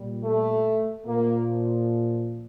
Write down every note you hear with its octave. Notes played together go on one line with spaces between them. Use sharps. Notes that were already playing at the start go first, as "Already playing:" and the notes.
Already playing: A#2 G3
A3
A#2 F3 A#3